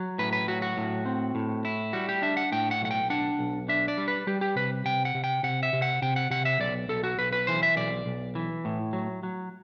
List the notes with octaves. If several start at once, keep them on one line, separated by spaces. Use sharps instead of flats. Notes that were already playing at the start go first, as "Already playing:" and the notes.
Already playing: F#3
A2 B4
B4
F#3 F#4
F#4
A2
C4
A2
E4
G3 F#4
G4
D4 E5
F#5
A2 G5
F#5
B1 F#5
G5
D4 F#5
B1
D4 E5
D5
G3
B4
G3 G4
G4
C3 B4
C3 G5
F#5
C3
G5
C3 F#5
E5
C3
F#5
C3 G5
F#5
C3 F#5
E5
B1 D5
B1 A4
F#4
B1 B4
B4
E3 C5
E5
B1 D5
B1
E3
A2
F#3
F#3